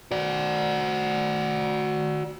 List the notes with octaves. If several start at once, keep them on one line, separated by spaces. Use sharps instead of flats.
F#4 D5